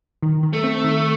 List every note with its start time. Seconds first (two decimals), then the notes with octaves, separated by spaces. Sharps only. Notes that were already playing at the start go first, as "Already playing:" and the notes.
0.23 D#3
0.43 D#3
0.53 A3
0.64 C4
0.84 D#3